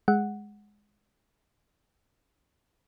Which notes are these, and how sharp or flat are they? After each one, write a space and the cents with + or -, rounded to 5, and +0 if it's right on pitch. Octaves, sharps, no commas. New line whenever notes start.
G#3 +0 F#5 +0